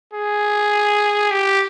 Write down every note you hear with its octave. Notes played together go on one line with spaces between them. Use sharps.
G#4
G4